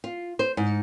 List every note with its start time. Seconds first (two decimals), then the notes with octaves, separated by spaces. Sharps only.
0.04 F4
0.39 C5
0.57 G#2